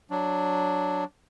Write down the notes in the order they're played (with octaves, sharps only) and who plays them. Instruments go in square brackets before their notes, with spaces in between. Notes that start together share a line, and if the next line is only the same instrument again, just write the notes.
[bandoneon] F#3 D4